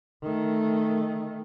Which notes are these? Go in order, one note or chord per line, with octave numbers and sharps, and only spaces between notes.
D#3 A3